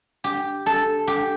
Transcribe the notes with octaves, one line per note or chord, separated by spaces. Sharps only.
G4
A4
G4